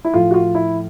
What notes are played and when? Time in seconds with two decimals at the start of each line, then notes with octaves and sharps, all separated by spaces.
0.05 E4
0.14 A2 F3 F4
0.31 F#4
0.34 F4
0.55 E4